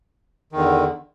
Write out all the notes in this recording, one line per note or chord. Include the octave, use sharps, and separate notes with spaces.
E2 D3 D#3